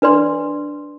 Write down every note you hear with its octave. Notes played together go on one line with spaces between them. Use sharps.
D4 B4 D5 C6